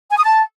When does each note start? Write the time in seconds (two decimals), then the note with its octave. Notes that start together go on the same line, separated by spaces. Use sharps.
0.10 G#5
0.17 D#6
0.23 A5